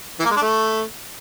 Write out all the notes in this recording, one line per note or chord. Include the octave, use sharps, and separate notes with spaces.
E3
A#3
G#3
D4
A3